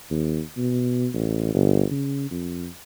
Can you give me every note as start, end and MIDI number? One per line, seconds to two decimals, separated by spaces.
0.11 0.42 39
0.57 1.08 47
1.14 1.54 33
1.54 1.84 31
1.91 2.27 49
2.31 2.68 41